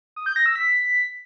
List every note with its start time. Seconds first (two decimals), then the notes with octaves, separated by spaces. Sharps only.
0.16 D#6
0.26 G6
0.36 A#6
0.46 E6
0.56 B6